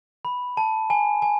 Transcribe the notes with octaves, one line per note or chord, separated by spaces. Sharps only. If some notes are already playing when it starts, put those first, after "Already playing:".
B5
A5
G#5
G#5